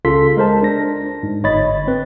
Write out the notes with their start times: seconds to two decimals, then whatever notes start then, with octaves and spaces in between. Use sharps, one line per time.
0.05 C#2 C#3 F4 A4 C6 B6
0.37 G#3 A#4 C5 A5
0.63 D4 A#6
1.23 G#2
1.44 G1 C#5 D#5 B5 A6
1.88 C4 B4